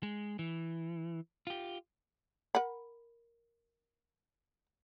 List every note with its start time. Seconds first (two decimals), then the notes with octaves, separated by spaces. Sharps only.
0.03 G#3
0.39 E3
1.47 F4 G4
2.55 A#4 F#5 B5